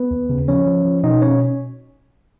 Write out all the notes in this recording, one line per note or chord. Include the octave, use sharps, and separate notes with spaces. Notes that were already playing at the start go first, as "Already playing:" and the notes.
Already playing: B3 B4
D#2
C#3
F3 C#4 C#5
F3
F3
B2 D#4 D#5
B2 C#4 C#5